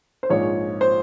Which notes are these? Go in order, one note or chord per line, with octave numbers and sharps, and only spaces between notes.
C5
A#1 G#2 F3 C#5
C5